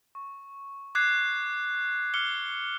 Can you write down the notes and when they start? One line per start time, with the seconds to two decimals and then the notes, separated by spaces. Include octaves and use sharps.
0.15 C#6
0.95 D6 F#6 G#6 C7
2.14 D6 F6 C#7 G7